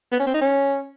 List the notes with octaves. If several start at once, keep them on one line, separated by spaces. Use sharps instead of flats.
B3
C#4
C4
D#4
C#4